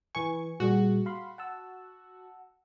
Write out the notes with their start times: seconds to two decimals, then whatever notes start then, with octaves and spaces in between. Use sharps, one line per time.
0.15 E3 B4 G#5 C#6
0.60 A#2 G3 F#4 G#4
1.06 F5 B5 C6
1.38 F#5 A5 E6